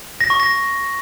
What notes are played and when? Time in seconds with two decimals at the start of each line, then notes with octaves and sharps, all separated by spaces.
0.21 A#6
0.30 C#6
0.40 A#6